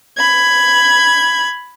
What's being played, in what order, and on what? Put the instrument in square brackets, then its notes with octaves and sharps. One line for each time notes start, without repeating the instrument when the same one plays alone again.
[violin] B5 G#6